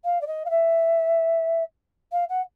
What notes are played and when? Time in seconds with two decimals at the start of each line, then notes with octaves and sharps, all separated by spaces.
0.04 F5
0.21 D5
0.27 D#5
0.45 F5
0.50 E5
2.12 F5
2.29 F#5